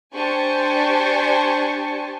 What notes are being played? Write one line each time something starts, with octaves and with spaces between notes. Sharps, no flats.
D4 G4 C5 G#5 A5 C#6